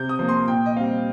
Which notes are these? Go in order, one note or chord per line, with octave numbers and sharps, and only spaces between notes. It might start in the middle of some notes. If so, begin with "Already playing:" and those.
Already playing: C3 G6
D#6
F3 A#3
C6
A#2 G5
D#5
G3 C4 F5